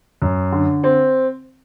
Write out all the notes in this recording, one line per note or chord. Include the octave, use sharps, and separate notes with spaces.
F#2
D3
C4